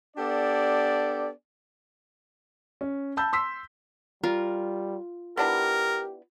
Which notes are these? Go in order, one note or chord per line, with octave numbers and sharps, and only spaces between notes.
B3 D4 G4 A4 D5
C#4
A5 B5 E6 G6
C6 E6 B6
G3 F4 A#4
B3 D4 E4 G4 A#4